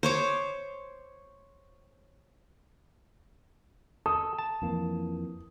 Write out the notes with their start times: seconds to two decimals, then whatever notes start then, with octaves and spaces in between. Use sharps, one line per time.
0.03 C5 C#5 D6
4.06 A4 D#6
4.39 A5
4.62 F2 E3 A#3